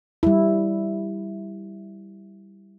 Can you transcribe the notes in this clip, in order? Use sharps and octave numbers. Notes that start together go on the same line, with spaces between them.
G3 E4